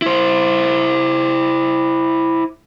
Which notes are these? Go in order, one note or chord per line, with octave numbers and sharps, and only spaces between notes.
E4 C5